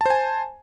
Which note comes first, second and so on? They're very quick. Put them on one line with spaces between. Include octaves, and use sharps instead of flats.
A5 C5 G#5